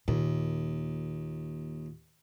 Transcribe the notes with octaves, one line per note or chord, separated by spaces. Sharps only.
D#2 A#2